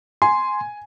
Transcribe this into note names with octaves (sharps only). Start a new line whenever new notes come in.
G#5 C6